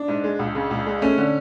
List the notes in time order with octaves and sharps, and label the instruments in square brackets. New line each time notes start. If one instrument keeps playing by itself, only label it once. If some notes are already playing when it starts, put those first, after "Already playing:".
Already playing: [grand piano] D4
[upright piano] G#2
G#3
C#2
C#3
C#2
G#3
[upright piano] A3 [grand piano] C#4
[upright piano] D3